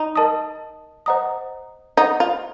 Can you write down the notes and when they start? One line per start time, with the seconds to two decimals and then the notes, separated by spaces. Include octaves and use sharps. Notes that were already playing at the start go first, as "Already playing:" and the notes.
Already playing: D#4
0.16 A#4 D#5 A5 D#6
1.06 C5 D#5 F#5 A#5 D#6
1.97 D#4 C5 D#5 F#5 A#5 D#6
2.20 F4